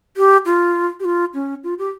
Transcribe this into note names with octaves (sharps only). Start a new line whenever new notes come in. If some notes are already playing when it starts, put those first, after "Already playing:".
G4
F4
G4
F4
C#4
F4
G4